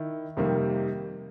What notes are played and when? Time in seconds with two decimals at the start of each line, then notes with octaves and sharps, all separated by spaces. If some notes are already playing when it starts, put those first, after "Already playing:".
Already playing: D#3 E4
0.37 F2 C3 D#3 G3 A#3